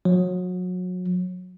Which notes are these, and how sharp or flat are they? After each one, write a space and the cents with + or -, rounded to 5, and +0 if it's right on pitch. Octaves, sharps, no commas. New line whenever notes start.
F#3 -30